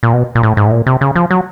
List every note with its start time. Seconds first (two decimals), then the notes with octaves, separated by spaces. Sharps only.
0.03 A#2
0.13 B2
0.35 A#2
0.43 A2
0.57 G#2
0.67 A2
0.72 A#2
0.87 C3
1.01 C#3
1.16 F3
1.31 F#3